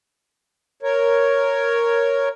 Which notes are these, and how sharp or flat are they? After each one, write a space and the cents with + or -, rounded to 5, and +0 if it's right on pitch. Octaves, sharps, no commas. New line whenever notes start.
A#4 +0 C#5 +0